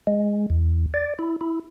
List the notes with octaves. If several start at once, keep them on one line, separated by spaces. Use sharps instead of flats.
G#3
E2
D5
E4
E4